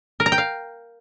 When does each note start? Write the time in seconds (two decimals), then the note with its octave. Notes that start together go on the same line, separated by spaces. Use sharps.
0.20 A#4
0.26 A#5
0.32 G5
0.38 F5